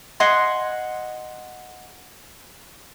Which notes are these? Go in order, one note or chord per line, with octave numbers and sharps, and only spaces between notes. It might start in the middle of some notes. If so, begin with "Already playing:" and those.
D#5 F#5 G#5 C6